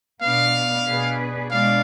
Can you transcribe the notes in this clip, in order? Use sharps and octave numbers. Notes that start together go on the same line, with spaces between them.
B2 B3 D4 F5
B2 B3 D4 G#4 B4
B2 G#3 D4 F5